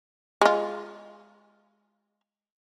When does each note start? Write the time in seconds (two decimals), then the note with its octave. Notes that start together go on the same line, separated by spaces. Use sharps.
0.41 G#3 F4